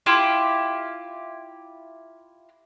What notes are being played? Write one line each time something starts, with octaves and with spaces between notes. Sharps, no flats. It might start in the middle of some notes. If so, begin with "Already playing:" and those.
E4 F4 G4